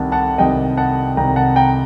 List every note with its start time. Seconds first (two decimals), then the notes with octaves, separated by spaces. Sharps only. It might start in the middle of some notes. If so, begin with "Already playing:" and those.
Already playing: C2 C3 D#3 F#5 A5
0.12 F#5 A5
0.38 C2 C3 D#3 D#5 G5
0.77 F#5 A5
1.17 C2 C3 D#3 G5 A#5
1.36 F#5 A5
1.56 G5 A#5